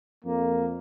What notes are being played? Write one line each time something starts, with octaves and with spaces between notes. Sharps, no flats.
F2 A#3